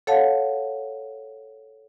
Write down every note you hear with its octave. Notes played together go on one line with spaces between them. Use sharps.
A4 C#5 F5 F#5 A5